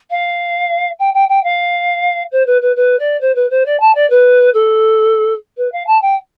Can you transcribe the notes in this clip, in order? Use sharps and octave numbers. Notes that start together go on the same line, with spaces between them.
F5
G5
G5
G5
F5
C5
B4
B4
B4
D5
C5
B4
C5
D5
A5
D5
B4
A4
B4
F5
A5
G5